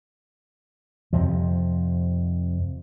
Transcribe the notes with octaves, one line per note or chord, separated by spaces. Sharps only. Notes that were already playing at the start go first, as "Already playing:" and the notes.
F2 C3 F3